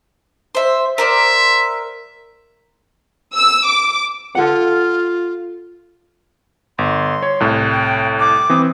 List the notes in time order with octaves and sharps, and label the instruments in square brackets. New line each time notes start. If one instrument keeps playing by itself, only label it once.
[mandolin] C5 E5
[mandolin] A#4 C5 D5 [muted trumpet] E5
[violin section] E6
D6
[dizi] F4 [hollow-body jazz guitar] A4 F#5
[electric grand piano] G1 [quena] C6
[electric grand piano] C#5
C2 A2
[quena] G5
D6
[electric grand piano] E3 C4 D#6